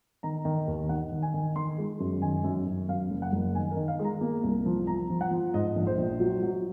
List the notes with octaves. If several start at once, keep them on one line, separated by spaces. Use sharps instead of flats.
D#3 A#5
D#3
D#2
D#3 F#5
D#3
G#5
D#3
D#3 C6
G#3
F#2
D#3 G#5
F#2
F#2
F#2 F5
F#1
F#5
F#1
D#3 G#5
A#4
D#3
F5
G#3
A#5
A#3
C2
F3
F3 A#5
F3
F#5
F3
G#2 D#5
A#1
C5
A#1
F#3
F#3